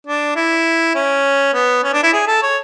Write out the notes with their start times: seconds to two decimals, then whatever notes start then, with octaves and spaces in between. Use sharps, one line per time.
0.07 D4
0.36 E4
0.95 C#4
1.54 B3
1.84 C#4
1.93 D4
2.03 E4
2.13 G#4
2.27 A4
2.42 C#5